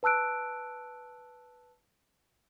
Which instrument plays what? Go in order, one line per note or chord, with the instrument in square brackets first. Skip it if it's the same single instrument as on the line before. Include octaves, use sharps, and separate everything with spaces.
[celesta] B4 A5 E6 F#6 D7